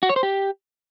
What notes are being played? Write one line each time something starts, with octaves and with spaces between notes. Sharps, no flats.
F#4
C#5
C5
G4